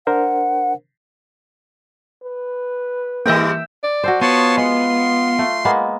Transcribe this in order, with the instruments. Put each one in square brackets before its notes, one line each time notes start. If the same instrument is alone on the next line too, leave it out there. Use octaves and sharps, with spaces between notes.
[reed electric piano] D4 A#4 C5 [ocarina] F#5
[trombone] B4
[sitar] G#2 G3 D#5 [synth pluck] E3 A#3 [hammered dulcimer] E5 G5
[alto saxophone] D5
[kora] F#4 A4 C5
[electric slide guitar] B3 [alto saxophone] F4 [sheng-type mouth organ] C#5 A5 C6
[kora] G#3 [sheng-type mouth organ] C6
[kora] A3
G#3 A#3 B3